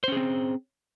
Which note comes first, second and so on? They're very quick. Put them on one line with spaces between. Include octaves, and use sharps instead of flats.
C5 C#4 G#4 C4